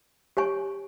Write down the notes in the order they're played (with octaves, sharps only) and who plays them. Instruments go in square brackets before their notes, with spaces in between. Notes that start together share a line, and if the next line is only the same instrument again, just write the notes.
[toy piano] G4 C#5 G#5 C#6